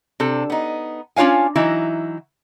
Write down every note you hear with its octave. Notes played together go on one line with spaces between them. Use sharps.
C3 D4 A4
B3 D#4
C#4 D4 F4 C#5 F5 G#5
E3 F#3 D#4 E4